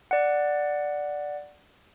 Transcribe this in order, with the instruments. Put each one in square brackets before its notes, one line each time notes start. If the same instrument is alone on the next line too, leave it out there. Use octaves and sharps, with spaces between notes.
[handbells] D5 F#5